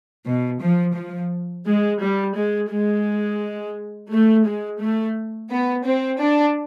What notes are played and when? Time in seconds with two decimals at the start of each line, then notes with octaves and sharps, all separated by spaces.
0.26 B2
0.61 F3
0.95 F3
1.65 G#3
2.00 G3
2.35 G#3
2.70 G#3
4.10 A3
4.45 G#3
4.81 A3
5.50 B3
5.85 C4
6.20 D4